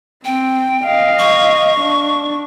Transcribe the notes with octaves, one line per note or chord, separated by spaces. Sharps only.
C4 G5
D#5 F5
C#6
D4